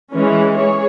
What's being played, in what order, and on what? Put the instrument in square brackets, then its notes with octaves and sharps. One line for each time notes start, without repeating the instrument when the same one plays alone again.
[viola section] E3 G#3 C#4
G#4 C#5